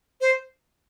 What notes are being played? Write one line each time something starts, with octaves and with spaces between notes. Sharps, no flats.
C5